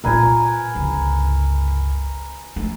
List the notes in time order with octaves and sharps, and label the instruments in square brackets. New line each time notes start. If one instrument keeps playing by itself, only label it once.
[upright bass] A#2 F4 [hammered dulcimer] A#4 B4 G#5
[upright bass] G1 C#2
G#3 A3